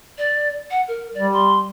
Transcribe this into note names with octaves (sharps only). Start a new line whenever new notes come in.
D5
F#5
A#4
G3 D5
C6